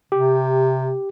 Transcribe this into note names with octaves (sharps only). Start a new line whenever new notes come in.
C3 G4